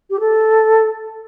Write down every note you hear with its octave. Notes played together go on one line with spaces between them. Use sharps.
G4
A4